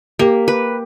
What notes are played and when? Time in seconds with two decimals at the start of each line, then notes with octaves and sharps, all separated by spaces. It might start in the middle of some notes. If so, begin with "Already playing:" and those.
0.19 A#3 G4
0.48 B4